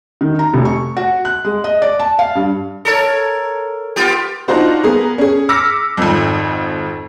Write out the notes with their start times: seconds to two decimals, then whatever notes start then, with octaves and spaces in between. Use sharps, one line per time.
0.21 D#3
0.39 A#5
0.54 F1
0.65 C#6
0.97 F#4
1.25 F#6
1.45 G#3
1.64 D#5
1.82 D5
1.99 A5
2.19 F5
2.35 G2
2.85 A4 A#4 C#5
3.96 B3 F4 G4
4.48 D4 D#4 F4 F#4 C5 D5
4.83 B3 G#4 A#4
5.18 C#4 G#4
5.49 D6 E6 F6 A#6 B6 C#7
5.97 G#1 F2